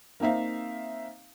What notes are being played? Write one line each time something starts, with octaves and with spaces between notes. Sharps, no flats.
A#3 C4 D#4 E5 F5